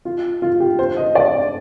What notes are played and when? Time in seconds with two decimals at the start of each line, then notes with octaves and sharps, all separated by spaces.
0.05 F4
0.42 F4
0.60 G4
0.79 C5
0.97 D#5
1.15 D5